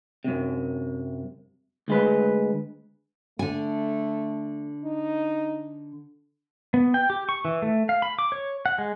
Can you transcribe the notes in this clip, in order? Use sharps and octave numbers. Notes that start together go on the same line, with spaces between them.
F#2 C3
D2 G#3 B4
D3 A3 G#5
D#4
B3
G5
G4
C#6
E3
A3
F5
B5
D6
C#5
F#5
G#3